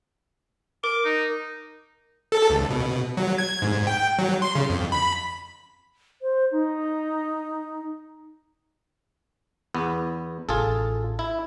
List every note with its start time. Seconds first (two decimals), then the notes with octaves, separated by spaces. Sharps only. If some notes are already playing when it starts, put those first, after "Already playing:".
0.84 A#4 D6
1.05 D#4
2.32 A4
2.50 C#2
2.70 B2
3.17 F#3
3.38 G#6
3.62 G#2
3.87 G5
4.19 F#3
4.42 C6
4.55 C#3
4.69 F2
4.92 B5
6.22 C5
6.52 D#4
9.74 E2 B3
10.49 A1 F4 G#4 A4
11.19 E4